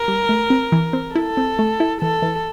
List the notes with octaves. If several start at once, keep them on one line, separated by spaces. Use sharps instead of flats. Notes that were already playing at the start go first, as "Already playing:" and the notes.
Already playing: A#4
G3
A3
C4
E3
C4
E4 A4
C4
A3
E4
E3 A4
E3